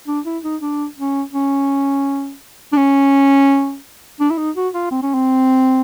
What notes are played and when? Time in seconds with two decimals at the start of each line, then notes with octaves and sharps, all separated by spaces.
0.07 D4
0.26 E4
0.44 D#4
0.61 D4
0.97 C#4
1.33 C#4
2.72 D4
2.77 C#4
4.20 D4
4.31 E4
4.38 D#4
4.56 F#4
4.74 F4
4.91 C4
5.02 C#4
5.14 C4